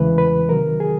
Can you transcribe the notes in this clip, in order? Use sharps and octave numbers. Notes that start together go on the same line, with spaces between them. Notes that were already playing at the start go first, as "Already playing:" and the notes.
Already playing: E2 C#3 E3 G#3 B4
B4
C3 D#3 F#3 A#4
G#4